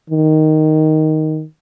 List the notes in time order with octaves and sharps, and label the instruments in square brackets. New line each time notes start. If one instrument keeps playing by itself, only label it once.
[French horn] D#3